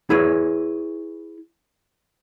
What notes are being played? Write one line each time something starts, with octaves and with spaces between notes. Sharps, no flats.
E4 G#4 B4 C#5